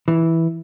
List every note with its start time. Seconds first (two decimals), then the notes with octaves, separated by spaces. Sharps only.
0.08 E3